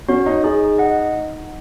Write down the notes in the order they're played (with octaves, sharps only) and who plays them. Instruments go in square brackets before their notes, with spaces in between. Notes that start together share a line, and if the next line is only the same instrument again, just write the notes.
[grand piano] C#4 [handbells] F#4 C#5
[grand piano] D#4
[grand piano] D#4 [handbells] G#4
[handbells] D#5 F#5